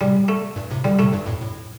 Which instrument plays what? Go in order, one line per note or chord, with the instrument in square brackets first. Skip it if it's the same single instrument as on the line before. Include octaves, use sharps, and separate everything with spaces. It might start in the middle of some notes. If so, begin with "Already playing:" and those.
[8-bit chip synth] A2 C3 [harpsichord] G3
[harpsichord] A3
[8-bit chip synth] G2 A#2
A2 C3
[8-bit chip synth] A#2 D3 [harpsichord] G3
[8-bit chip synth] A2 C3 [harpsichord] A3
[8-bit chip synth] G2 A#2
F2 A2
A2